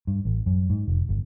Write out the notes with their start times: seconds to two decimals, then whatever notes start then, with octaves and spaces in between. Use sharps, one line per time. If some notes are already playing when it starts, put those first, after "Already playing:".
0.07 G2
0.25 A1
0.46 F#2
0.70 G#2
0.88 F1
1.09 G1